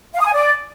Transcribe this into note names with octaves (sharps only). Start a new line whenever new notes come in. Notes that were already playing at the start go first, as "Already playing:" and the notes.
F5
D#6
G#5
D5